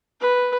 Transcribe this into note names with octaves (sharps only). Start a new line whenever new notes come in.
B4